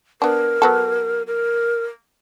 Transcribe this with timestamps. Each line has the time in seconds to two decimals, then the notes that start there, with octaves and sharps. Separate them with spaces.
0.22 B3 D4 A#4
0.62 F#3 B3 A4
1.27 A#4